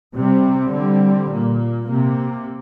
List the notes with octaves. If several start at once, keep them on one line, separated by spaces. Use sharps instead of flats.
C3 G3 C4
D3 G3 C4
A#2 A#3
C3 A#3